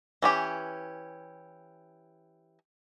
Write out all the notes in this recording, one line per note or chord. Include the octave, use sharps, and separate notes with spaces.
E3 C#4 G4